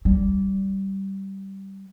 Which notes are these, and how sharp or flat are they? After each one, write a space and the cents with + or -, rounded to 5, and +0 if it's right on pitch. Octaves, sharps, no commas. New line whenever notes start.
G3 -15